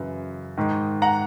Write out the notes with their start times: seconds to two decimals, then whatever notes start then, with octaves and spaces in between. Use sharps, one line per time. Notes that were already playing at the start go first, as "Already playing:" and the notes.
Already playing: F#2 C#3 E3
0.57 G#2 D#3
1.02 F#5 A#5